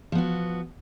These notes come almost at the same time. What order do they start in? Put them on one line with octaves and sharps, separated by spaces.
F3 B3 F#4